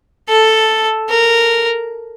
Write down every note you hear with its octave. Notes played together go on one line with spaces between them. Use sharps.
A4
A#4